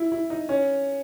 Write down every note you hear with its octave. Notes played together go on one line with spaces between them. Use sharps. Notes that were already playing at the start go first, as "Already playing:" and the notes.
Already playing: E4
E4
D#4
C#4